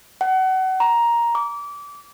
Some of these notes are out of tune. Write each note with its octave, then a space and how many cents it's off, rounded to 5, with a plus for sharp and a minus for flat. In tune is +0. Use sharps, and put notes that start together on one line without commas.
F#5 +30
A#5 +10
D6 -25